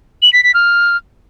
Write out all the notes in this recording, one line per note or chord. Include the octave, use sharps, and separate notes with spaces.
F#7
B6
B6
F6